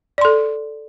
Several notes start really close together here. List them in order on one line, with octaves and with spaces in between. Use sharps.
D5 C6 A4